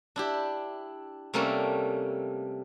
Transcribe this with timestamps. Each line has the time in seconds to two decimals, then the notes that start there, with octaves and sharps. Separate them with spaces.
0.16 D4 E4 G4
1.34 C3 G3 A3 A#3 C#4 A4